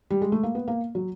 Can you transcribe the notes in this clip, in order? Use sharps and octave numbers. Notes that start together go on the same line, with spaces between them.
G3
G#3
A3
A#3
B3
A#3
F#3